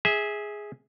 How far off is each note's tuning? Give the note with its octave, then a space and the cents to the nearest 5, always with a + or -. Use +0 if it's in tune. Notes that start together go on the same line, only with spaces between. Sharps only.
G#4 +0 E5 -20